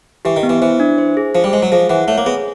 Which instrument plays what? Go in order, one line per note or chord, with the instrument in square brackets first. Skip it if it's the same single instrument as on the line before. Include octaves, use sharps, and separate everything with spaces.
[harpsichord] E3 [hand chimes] G4
[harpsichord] D#3
[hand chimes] B3
[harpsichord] E3
[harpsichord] E3 [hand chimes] C5
[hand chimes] D4
C5
G#4
[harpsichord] F3 [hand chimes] C5
[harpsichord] G3
[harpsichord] G#3 [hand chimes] C5
[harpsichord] F#3
[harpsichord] F3 [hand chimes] G#4
[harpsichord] E3 [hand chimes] F#5
[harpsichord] A3 [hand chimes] C#5
[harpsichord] A#3
[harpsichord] B3 [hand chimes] G#4